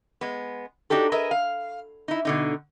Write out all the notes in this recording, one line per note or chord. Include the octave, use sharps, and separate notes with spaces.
G#3 B3
D4 D#4 F#4 G4 A4
G#4 A#4 B4 D#5 E5
F5
D#4 E4
B2 D3 D#4